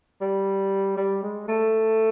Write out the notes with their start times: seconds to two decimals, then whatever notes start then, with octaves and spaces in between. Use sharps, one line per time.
0.21 G3
0.97 G3
1.23 G#3
1.48 A3